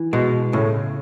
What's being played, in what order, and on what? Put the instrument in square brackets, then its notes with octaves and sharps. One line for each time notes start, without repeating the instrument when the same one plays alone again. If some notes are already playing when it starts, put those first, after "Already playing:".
Already playing: [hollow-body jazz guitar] E3
[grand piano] B2 [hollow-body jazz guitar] G#3
[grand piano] A2 [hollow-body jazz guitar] C#3